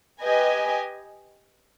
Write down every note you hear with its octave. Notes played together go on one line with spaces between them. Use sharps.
G4 B4 D#5 G#5